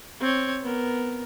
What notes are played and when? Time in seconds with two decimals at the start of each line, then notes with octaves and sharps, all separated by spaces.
0.20 C4 C#5
0.63 B3 A#4